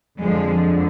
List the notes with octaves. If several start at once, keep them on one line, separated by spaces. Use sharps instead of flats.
F2 D3 F3 G#3